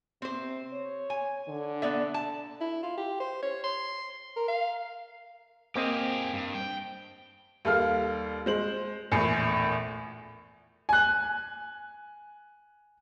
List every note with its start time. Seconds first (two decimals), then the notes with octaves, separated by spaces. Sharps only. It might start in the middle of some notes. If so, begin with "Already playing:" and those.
0.22 C3 C4 C5
0.73 C#5
1.10 G#5
1.49 D3
1.82 B3 D5 E5
2.14 A5
2.61 E4
2.83 F4
2.97 G4
3.20 C5
3.42 C#5
3.64 C6
4.36 A#4
4.48 F5
5.75 A#3 C4 G4 G#4 D#5
6.33 G2
6.55 G5
7.65 D#2 G3 A4 F5 F6
8.46 G#3 C5 F#7
9.12 A#1 E2 A2 G#5 C7 C#7
10.89 G#5 F#6